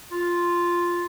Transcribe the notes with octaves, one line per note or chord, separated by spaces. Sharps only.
F4